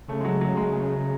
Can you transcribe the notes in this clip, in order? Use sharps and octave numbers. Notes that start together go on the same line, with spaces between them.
C#3 A3
G#3
F#3
F#3
G#3
G#3